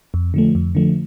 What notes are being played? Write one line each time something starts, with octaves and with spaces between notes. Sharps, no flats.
F2
D3 F3 A3
F2
D3 F3 A3